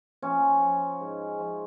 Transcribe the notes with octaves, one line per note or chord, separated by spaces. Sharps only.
F3 C#4
F3
G#2
F3